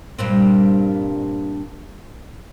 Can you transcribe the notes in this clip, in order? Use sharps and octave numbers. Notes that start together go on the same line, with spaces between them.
G2 A#2 C4